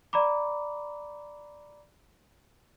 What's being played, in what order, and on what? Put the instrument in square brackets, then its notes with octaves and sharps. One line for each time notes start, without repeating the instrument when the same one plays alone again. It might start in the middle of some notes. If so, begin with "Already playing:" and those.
[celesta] D5 A#5 B5 D6